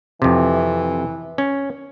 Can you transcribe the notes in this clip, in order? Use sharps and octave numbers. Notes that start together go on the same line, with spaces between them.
F2 C3 E3
C#4